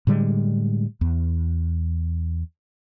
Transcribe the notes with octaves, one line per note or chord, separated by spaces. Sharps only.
A2 D3 G3 G#3
E2